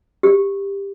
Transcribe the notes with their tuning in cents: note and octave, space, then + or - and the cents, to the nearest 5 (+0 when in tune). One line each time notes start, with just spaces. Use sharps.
G4 +15